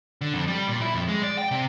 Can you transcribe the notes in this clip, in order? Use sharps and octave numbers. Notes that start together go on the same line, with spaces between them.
D3
F2
G3
A#2
E4
F2
G#3
D5
G5
C3